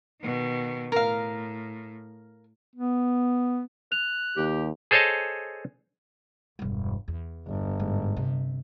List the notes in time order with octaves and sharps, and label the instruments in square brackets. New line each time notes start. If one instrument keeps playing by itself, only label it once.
[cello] B2 D#3
[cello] A2 [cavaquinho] A#4 F5
[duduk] B3
[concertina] F#6 [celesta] F7
[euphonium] D#2 [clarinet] G4
[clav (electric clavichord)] G#4 A4 C5 C#5 D#5 A5
[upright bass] E1 G2
E2
[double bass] G1
[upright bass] G#2
C3